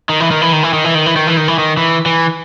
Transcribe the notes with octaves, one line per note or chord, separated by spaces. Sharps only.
D#3
E3
D#3
E3
D#3
E3
D#3
E3
D#3
E3
D#3
E3
D#3
E3
D#3
E3
E3